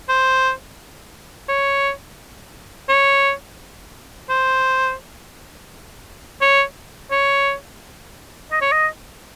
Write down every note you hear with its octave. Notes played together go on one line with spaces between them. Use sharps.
C5
C#5
C#5
C5
C#5
C#5
D#5
C#5
D#5